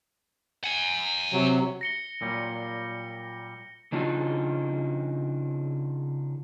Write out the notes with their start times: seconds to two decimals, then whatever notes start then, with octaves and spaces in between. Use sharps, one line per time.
0.64 F#5 G#5
1.33 C3 F#3
1.81 A#6 C#7 G7
2.22 A#2 F#3 G3
3.92 C#3 D4 D#4 F4 F#4